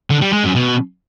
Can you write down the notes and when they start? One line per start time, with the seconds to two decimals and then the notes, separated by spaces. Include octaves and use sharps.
0.10 D3
0.21 G3
0.33 G#3
0.44 F#2
0.55 B2